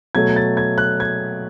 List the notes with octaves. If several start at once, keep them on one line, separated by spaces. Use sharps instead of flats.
B2 F#3 A3 G#6
A6
G#6
F#6
G#6